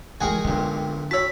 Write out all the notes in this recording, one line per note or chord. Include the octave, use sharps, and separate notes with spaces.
D3 E3 G#3 F#4 G#4 A#4 G5 G#5
B1 A#2 D3
F#4 C#5 A5 B5 E6 B6